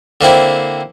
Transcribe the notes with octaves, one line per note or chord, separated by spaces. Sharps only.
D3 A#3 C4 E4